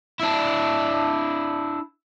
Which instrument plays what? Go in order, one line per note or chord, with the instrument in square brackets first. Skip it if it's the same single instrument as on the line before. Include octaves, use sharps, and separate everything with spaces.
[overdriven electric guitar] D4 E4